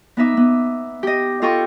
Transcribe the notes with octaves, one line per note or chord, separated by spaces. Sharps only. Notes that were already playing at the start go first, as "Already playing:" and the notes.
B3 D#4 E5 D6
B3
G4 D#5
F4 A4 D#5 G5 C#6